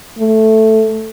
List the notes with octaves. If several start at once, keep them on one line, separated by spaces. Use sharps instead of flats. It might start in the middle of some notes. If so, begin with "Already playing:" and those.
A3